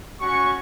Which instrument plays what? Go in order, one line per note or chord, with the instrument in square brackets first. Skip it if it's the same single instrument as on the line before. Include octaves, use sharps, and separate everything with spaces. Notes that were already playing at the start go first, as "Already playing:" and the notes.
[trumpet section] C#4 F#4 C#6